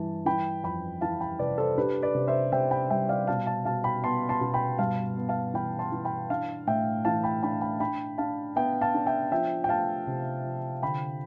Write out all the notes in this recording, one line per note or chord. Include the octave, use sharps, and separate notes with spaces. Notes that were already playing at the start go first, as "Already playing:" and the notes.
Already playing: G2 E3 A5
E3 G5 B5
F2 G5 B5
E3 F5 A5
G5 B5
C3 B4 D5
A4 C5
D4 G4 B4
B4 D5
C3
C5 E5
C3 E5 G5
G5 B5
G3 E5 G5
D5 F5
B2 F5 A5
F5 A5
B2 F5 A5
G5 B5
B3 A5 C6
A5 C6
B2
G5 B5
G2 F5 A5
B3
F5 A5
E3 G5 B5
A5 C6
E3
G5 B5
D4 F5 A5
A2 E5 G5
E3 F5 A5
G5 B5
D4 G5 B5
G5 B5
D4 G5 B5
D4 F5 A5
B3 E5 G5
F5 A5
D4
E5 G5
F3 E5 G5
G5
A3 F5 A5
C3
F3
D3 G5 B5